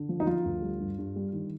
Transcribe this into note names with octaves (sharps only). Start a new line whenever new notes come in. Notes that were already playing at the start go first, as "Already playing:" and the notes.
Already playing: D3
F3
D#4
F3 F4
D2
G3
G2
G2
G3
D#3